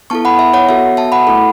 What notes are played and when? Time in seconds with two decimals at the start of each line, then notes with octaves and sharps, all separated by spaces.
0.10 B3 E4 A4 A5 C#6
0.25 F#5 B5
0.39 E5
0.53 C#5 F#5
0.69 B3 F#4 A4 E5
0.97 E5 A5
1.12 F#5 B5
1.27 A3 E4 A4